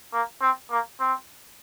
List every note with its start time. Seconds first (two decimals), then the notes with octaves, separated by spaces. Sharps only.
0.13 A#3
0.41 C4
0.70 A#3
1.00 C4